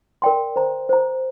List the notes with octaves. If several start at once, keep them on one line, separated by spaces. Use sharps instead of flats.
A#4 D5 G5 C6
C5 A#5
C5 A#5